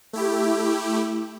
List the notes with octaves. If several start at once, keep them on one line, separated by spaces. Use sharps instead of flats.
A3 E4 G4